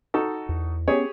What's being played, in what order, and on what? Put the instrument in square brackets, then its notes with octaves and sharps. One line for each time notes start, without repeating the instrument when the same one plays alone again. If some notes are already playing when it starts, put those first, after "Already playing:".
[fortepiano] D#4 F#4 A4
[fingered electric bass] E2
[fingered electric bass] B3 C#4 [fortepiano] G4 G#4 C#5